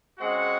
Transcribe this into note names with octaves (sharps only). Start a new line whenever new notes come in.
C#3 G#3 C4 F#4 F#5